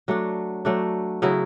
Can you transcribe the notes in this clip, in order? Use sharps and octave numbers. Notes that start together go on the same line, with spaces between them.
F#3 A3 D4
F#3 A3 D4
C#3 F#3 B3 E4